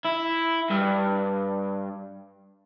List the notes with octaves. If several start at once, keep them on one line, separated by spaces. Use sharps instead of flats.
E4
G2